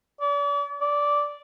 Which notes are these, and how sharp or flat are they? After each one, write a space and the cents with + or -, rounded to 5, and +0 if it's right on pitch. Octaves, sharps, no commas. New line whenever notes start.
D5 -40
D5 -10